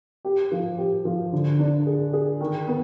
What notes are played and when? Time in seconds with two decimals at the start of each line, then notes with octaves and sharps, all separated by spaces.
0.25 G4
0.52 F3
0.78 G4
1.05 F3
1.32 D3
1.59 D4
1.87 G#4
2.13 G#4
2.41 D#3
2.67 B3